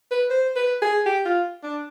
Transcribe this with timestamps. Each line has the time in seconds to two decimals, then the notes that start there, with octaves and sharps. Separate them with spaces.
0.11 B4
0.30 C5
0.56 B4
0.82 G#4
1.06 G4
1.25 F4
1.63 D4